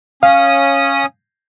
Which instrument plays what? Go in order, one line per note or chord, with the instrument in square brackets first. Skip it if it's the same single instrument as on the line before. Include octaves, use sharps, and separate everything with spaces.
[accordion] C#4 D#6 [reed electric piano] F5